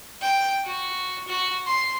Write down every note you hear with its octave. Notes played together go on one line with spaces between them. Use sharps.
G5
F#4
F#4
C6